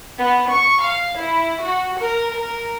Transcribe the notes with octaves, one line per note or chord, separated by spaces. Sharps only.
B3
C#6
F5
E4
F#4
A#4
A#4